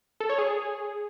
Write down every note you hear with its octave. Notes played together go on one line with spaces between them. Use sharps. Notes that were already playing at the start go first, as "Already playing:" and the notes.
A4
C#5
G#4